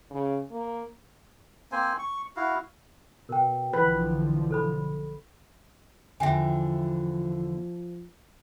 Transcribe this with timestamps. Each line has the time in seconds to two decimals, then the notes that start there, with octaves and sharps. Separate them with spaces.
0.10 C#3
0.51 A#3
1.72 A#3 C4 C5 G#5
1.99 C#6
2.36 E4 F#4 F5
3.29 B2 A#4 G5
3.73 B1 D3 E3 F3 B4
4.51 A4 C5 B5
6.20 E2 D3 F3 E5 G5 G#5